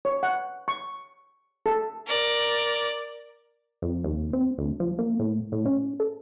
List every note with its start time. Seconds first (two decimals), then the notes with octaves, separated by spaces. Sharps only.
0.05 C#5
0.23 F#5
0.68 C#6
1.66 A4
2.07 A#4 D5
3.82 F2
4.04 D#2
4.33 C4
4.58 D2
4.80 F3
4.98 A#3
5.19 A2
5.52 A2
5.66 C#4
6.00 A4